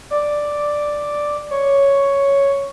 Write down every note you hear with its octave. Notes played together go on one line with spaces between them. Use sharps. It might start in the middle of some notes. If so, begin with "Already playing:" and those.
D5
C#5